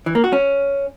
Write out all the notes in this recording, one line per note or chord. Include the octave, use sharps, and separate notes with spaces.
E3
A#3
F#4
C#4